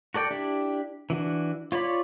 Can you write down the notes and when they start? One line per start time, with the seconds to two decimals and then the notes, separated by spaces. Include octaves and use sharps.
0.14 F#4 A4 D5 G5
0.31 D4 E4 G4
1.10 E3 D4 F#4
1.72 F4 C#5 D5 B5